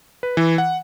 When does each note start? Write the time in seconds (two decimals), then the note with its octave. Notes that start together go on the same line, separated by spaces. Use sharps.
0.23 B4
0.37 E3
0.58 F#5